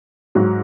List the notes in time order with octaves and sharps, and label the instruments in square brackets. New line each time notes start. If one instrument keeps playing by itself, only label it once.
[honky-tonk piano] G#2 F#3